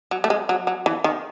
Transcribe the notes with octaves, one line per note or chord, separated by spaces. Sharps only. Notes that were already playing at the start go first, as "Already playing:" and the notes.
F#3
A3
G#3
F#3
F#3
E3
D#3